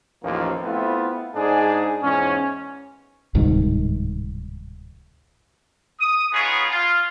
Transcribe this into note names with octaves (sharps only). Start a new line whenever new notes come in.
A1 D#2 F3 A#3
A3 B3 C4 E4 F4
G#2 D4 D#4 G#4
E2 G#2 C#4
D1 C2 G#2 D#3
D#6
B3 D#4 F4 G#4 C#5
F4